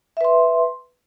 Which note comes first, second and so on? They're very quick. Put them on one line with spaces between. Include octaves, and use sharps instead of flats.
E5 B4 C6